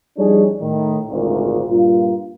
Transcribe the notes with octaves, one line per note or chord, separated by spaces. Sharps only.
F2 G3 D4 D#4 G#4 C#5
A2 D#3
G#1 D2 A#2
G2 A#2 A#3 F4